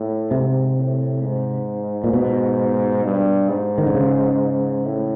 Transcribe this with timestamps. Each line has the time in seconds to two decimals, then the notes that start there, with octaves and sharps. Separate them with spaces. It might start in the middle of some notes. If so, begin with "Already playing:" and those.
Already playing: A2
0.31 G#2 C3
0.77 A2
1.22 G#2
2.04 A#2
2.13 B2
3.04 G2
3.49 G#2
3.78 D#3
3.87 D3
3.94 C#3
4.85 A2